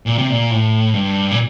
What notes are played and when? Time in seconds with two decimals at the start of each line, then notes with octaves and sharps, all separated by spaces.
0.06 A#2
0.18 C3
0.30 A#2
0.51 A2
0.94 G2
1.31 A#2